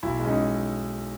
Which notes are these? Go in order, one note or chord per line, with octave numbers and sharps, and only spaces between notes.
B1 E4
G#3 C#4
D#4
G#3